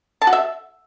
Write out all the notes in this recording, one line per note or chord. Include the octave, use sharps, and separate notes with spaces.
A5
F#4
E5